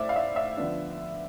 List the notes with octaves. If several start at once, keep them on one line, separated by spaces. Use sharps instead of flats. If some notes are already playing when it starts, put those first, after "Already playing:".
Already playing: A2 A3 C5 D5 E5
F5
E5
E5
D3 F3 B3 D4